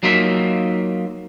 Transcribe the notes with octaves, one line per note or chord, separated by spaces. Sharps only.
F#3 A#3 D#4 F4 E5